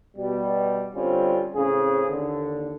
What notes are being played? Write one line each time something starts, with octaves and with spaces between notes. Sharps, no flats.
B2 G3
D3 G3 C4 C#4 F4
A2 C#3 C4 G#4
D#2 D3